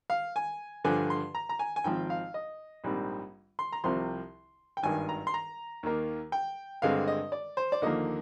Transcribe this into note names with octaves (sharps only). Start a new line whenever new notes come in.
F5
G#5
G2 D3 F3 G#5
C6
A#5
A#5
G#5
G#5
G#1 G#2 F3 C4 G5
F5
D#5
A#1 G#2 G3 C4
C6
A#5
C2 C3 F3 C4 C6
G5
G#1 G2 D#3 G#5
A#5
C6
A#5
D#2 D#3 A#3
G5
G2 D3 G#3 C4 F5
D#5
D5
C5
D5
D#2 D3 F3 A#3 D#5